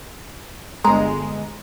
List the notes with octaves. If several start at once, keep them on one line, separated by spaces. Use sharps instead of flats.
G1 G#3 A#5